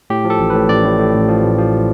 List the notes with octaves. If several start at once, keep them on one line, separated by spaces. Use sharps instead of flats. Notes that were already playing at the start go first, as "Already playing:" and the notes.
A2 G4
F3
A4
A1
A2 B4
A1 D5
A2
A2
A1
F3
A1
F3